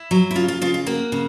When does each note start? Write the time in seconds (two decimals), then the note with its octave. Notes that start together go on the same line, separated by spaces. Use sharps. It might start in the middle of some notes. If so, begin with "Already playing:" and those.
Already playing: E4
0.11 F#3
0.31 E4
0.35 C#3 F4
0.48 F4
0.62 C#3 F4
0.74 F4
0.87 A#3 F#4
1.12 C#3